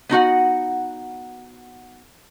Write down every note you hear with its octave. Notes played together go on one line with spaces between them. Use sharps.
B3 D#4 F#4 F#5